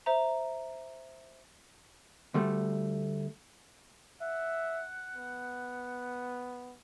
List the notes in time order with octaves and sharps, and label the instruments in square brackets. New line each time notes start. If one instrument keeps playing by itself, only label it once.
[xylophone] C5 E5 A#5
[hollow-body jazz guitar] D2 G3 A3
[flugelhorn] E5 [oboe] F#5
[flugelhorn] B3